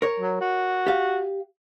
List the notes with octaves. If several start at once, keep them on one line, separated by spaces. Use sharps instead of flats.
A#4 C#5
F#3
F#4
G4 F5